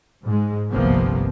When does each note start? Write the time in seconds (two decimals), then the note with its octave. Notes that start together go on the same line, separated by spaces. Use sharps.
0.25 G#2 G#3
0.71 G1 C2 C3 F3 A#3 B3